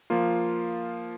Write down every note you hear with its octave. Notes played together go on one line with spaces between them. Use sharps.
F3 A#3 F4